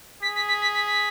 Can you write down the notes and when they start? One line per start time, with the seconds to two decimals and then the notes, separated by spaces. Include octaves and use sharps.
0.22 G#4 B6
0.36 B6
0.48 B6
0.62 B6
0.75 B6
0.87 B6